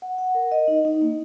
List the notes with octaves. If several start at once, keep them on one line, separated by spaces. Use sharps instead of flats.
F#5
F#5
A#4
D#5
D#4
D#4
A#3